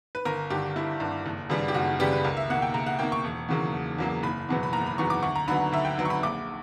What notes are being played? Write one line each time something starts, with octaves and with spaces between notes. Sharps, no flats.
B4
G1 A#4
G2 D3 G4
G1 E4
G2 D3
F#1
F#2 C#3 G3 B3
G4
F#1 F#4
F#2 C#3 G3 B3 G4
B4
C#2 A#4
E5
B2 A#3 F#5
G5
C#2 A#5
F#5
B2 A#3 G5
C#6
E1
E2 C#3 F#3 A#3
E1
E2 C#3 F#3 A#3
F#1 B5
E2 B2 F#3 B3
B5
F#1 A#5
B5
E2 B2 F#3 B3 C#6
D6
D2 C#6
A#5
D3 F#3 B3 B5
D2 E5
G5
D3 F#3 B3
C#6
B5
A#1 D6